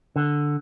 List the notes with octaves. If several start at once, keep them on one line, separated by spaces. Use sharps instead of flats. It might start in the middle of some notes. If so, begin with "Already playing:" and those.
D3